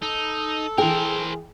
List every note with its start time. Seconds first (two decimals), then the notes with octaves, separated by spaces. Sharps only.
0.02 D#4 A4
0.78 E3 G#4 A#4 C5 G5